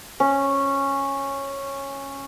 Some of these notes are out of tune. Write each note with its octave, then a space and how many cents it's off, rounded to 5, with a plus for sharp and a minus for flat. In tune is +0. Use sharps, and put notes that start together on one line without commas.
C#4 -10